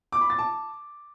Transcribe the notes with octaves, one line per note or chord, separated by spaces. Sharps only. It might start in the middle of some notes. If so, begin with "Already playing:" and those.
D6
B5
A6
A5